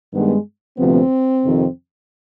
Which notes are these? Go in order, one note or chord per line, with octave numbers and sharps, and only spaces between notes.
G2 D#3 G#3 B3
D2 C3 F3 B3 C4
F2 C3 D#3